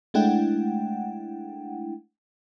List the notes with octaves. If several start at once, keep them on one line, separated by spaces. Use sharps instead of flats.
G#3 A3 D4 E4 F#5 G5